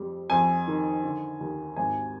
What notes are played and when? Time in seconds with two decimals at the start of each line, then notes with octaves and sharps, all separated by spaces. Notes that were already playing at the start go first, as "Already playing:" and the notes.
Already playing: F2 G3
0.30 F2 G#5
0.67 D#3
1.04 D3
1.41 D#2
1.76 G#1 G#5